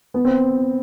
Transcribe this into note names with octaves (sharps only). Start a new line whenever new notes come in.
B3
C4